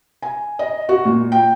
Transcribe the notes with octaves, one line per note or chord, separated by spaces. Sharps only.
G#5
D#5
F#4
A#2
G5